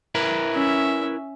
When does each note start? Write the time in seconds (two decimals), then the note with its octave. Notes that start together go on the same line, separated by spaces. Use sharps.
0.15 E4 A#4 B4
0.53 C#4 E5